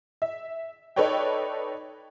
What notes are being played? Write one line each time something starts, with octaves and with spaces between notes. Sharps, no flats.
E5
D#4 A4 B4 C#5 D5 G5